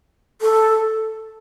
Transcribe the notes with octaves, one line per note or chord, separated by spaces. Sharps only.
A4